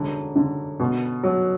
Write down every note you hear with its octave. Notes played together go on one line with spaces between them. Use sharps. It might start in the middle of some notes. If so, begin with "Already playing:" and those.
Already playing: E1 D3
D3
B2
F#3